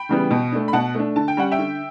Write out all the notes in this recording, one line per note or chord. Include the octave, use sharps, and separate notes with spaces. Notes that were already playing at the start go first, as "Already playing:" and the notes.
Already playing: G5 B5
C#3 E3 G3 B3
B2
A3 D4
B5
B2 F#5 A5
A3 D4
D3 A5
G5
G3 C#4 F#5
E5 G5
D3